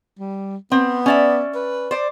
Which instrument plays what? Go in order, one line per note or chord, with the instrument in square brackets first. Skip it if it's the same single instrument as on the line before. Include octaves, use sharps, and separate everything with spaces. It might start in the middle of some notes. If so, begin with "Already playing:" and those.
[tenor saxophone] G3
[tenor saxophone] B3 [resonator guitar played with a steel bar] C4
[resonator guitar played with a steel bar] C#4 D5 E5
[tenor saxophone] B4
[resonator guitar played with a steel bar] C5 D5